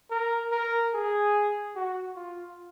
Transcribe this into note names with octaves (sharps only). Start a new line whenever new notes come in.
A#4
A#4
G#4
F#4
F4